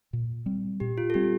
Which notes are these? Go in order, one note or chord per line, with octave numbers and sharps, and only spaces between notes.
A#2
G3 C4
A#2 G4
F4
A4
G3 C4 G4